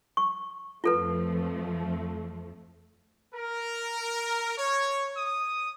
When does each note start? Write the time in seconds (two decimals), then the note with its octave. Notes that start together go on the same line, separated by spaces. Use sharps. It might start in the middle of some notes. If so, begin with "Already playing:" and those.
0.17 C#6
0.84 F2 F3 A3 F4 A4 B4
3.34 A#4
4.58 C#5
5.17 D#6